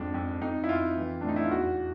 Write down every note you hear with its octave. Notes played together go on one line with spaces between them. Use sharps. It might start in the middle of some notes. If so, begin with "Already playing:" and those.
Already playing: F2 G#2 D4
F2
F2 D#4
E4
F2 F4
E3
D4
A2 D#4
E4
F4
E2 F#4